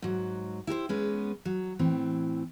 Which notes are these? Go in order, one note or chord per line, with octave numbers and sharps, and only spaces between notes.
G#2 F#3
E4 G4 A#4 C5
G#3 B3 C#4 B4
F#3
A2 E3 C4